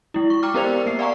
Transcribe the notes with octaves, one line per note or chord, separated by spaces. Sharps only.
G#3 E4
C#6
G5 A#5 D6 F6
B3 G4 A#4 C5 D5 F7
A#3 C7
D5 F5 F#5 G#5 A#5 C#6